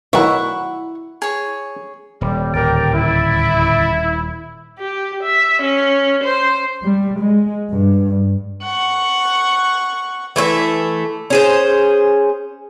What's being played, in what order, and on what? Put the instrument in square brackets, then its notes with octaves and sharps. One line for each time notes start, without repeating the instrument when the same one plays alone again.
[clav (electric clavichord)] B1 D#3 F#3 [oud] E4 [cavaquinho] F#5 C#6
[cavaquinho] G#4 C#5
[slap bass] D#1 [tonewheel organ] A#2 [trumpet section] G3
[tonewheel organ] D2 A2 D3 [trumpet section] G4 A#4 G5
[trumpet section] E4
[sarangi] G4
E5
C#4
C5
[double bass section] G3
G#3
G2
[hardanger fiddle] F#5 C#6
[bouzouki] E3 A3 C5 E5
C#4 G#4 C5